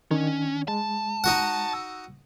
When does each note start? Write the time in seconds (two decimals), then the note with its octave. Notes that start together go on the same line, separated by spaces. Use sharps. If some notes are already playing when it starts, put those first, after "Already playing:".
0.11 D#3 C#4 D4
0.68 G#3 A5
1.24 D#4 F#4 F#5
1.73 E6